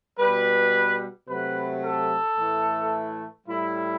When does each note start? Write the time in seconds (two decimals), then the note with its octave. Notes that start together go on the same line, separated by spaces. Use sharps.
0.19 B2 G3 B4
1.28 C3 F#3 A3 B4
1.83 A4
2.37 A2 E3 A3
3.47 A2 G3 E4